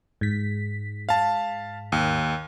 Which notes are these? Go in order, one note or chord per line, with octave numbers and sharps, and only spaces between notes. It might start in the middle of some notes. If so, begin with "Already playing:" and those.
G#2 B6
F5 A5
D#2